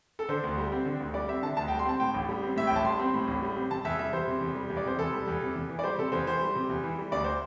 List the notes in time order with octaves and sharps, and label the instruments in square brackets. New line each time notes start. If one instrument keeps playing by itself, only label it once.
[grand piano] A4
D3 C5
D2
G3
C4
D3
D2
G3 D5
C4 E5
D3 A5
D2 A5
G5
G3
C6
C4 A5
A2 G5
A1
G3
C4
A2 E5
A1 G5
A5
G3 C6
C4
A2
A1
G3
C4
C3 A5
E2 E5
G3 E5
E2 C5
C3
E2
G3
E2
D5
C3 C5
E2 A4
G3
E2
C3
E2
E3
D5
G3 C5
C3 A4
E2 C5
E3 C5
G3
C3
E2
E3
G3
D2 D5
C5